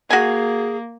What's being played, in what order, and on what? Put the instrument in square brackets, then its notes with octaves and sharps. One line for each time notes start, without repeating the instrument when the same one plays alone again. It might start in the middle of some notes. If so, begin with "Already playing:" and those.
[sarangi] A#3 [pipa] F#4 G#5 [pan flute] G#4